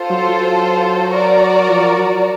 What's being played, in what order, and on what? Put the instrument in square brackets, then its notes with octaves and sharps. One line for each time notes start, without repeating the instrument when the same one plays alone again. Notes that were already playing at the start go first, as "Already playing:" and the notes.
Already playing: [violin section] F4 A4 C5
[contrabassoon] F#3
F#3
[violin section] F#4 A#4 D5
[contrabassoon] F3
F#3